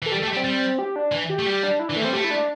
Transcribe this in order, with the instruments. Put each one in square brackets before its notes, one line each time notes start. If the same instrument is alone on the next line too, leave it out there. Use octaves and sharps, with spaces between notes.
[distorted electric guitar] E3 [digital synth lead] A4
[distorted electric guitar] G3 [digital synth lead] G4
[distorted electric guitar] A3 [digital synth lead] A4
[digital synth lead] G4
[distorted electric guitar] G3
[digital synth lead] C4
[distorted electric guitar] G3
[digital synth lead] G4
D4
[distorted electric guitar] E3
[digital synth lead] G4
[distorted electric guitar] A3
[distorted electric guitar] G3 [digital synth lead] G4
[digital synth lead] D4
E4
[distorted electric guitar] E3 [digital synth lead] D4
[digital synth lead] A3
[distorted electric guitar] G3 [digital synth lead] C4
[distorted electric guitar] A3 [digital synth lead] G4
[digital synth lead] E4
D4